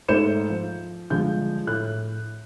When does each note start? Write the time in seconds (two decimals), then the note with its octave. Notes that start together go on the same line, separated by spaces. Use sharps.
0.08 G#2 A3 C5 G6 C#7 E7
0.50 F3
1.10 G1 F3 G#3 G6
1.67 A2 F#6